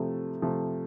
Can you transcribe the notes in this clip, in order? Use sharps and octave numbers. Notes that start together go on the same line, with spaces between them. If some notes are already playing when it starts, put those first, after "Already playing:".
Already playing: C3 F3 A3
C3 F3 A3